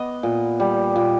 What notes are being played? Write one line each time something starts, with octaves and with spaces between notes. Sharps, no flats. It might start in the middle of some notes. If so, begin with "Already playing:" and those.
Already playing: B3 D#5
A#2
G3
A#2